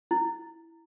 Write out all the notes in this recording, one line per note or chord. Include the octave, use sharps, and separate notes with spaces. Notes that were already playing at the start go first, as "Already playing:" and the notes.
E4